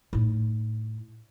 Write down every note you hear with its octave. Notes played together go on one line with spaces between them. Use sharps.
A2 D#4